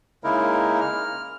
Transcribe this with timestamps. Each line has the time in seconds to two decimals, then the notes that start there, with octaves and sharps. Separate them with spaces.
0.24 C#3 G#3 A#3 D#4 E4 A#4
0.81 F6